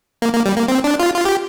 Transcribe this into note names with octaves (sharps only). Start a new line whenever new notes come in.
A#3
A#3
G3
A#3
C4
D4
F4
F4
G4